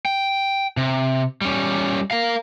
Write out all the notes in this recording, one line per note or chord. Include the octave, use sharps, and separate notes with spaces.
G5
C3
G3 C#4
A#4 F5